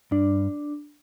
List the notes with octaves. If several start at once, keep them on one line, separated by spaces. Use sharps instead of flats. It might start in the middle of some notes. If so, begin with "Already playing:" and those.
G2 D4